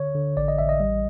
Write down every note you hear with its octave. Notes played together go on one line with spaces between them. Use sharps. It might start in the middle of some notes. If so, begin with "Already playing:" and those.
Already playing: D3 C#5
D3
A1 D5
D#5
A1 E5
D#5
G3